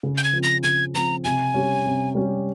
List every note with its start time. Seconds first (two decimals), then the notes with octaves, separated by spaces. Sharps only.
0.03 C#3
0.17 G6
0.24 G#6
0.33 F3 C4
0.43 A#6
0.63 C#3 G#6
0.94 F3 C4 A#5
1.24 C3 G#5
1.54 G3 C#4 G4
1.86 C3
2.15 G3 C#4 G4